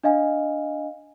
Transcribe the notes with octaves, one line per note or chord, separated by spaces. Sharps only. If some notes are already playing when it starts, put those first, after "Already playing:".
D4 D#5 F5 G#5